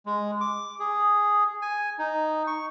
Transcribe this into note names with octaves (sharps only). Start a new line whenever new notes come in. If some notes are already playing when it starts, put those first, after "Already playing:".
G#3
D6
G#4
G#5
D#4
C#6